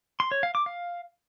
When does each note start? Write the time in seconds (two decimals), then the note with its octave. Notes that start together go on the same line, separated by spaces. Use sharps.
0.20 C6
0.31 C#5
0.43 F5
0.55 D6
0.66 F5